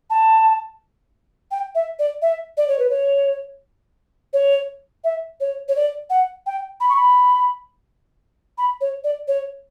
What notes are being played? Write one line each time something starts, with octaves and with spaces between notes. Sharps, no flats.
A5
G5
E5
D5
E5
D5
C#5
B4
C#5
C#5
E5
C#5
C#5
D5
F#5
G5
B5
C#6
B5
B5
C#5
D5
C#5